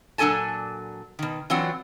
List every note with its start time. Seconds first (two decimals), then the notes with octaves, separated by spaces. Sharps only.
0.18 A#2 F#3 D4 A4 G#5 A5
1.19 B2 D#3
1.50 E3 F#3 C4 D4 F4 F#5